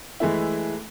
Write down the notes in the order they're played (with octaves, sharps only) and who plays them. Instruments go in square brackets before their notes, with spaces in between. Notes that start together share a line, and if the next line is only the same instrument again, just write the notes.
[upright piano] E3 G#3 A3 E4